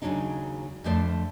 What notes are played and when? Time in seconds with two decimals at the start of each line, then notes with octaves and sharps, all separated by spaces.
0.02 D#2 C#3 F#3 G#3 D4 D#4
0.84 F2 D3 F3 A3 C5 D5